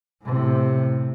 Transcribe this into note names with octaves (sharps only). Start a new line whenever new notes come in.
A2 C3